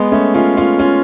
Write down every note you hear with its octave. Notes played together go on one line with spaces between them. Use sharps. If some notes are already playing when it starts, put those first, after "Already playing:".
Already playing: G#3 B3
A3 C#4
C#4 F4
C#4 F4
C#4 F4